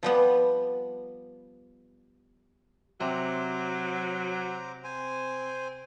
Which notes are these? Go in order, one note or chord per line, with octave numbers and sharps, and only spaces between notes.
F3 G3 B3
C3 F#3 C5 A#5 D6
C4 C5 G#5